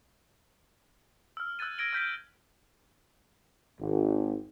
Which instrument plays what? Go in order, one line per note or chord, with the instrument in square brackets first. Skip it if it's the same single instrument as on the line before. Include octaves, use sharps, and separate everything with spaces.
[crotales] E6 F6
E6 F#6 G#6 A6 D#7
E6 G#6 A#6 D7 F#7 G7
F6 G6 B6 D7
[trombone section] G#1